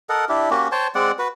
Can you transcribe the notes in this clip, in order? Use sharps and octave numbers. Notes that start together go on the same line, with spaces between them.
A4 A#4 D#5 F#5
D4 E4 G4
A#3 C#4 F#4 G4
C5 C#5 G5 A5
G#3 C4 D5 F#5
F#4 B4